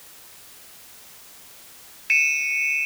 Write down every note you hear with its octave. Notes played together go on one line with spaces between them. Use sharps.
C#7 D#7 E7